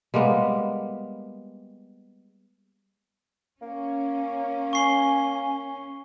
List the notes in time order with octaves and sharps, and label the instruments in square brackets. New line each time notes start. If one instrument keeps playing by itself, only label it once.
[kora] G3 G#3 A#3 B3
[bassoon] A#3 [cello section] C#4
[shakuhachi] G#5 [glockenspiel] C#6 C7 G7